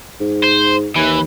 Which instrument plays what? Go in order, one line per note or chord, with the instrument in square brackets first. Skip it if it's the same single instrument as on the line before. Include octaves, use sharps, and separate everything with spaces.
[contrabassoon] G#2
[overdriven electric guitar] C5
[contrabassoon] D#2 [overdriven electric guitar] E3